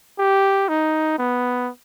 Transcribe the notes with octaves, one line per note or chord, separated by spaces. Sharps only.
G4
D#4
B3